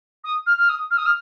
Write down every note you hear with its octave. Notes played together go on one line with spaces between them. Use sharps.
D#6
F6
F6
D#6
F6
D#6
F6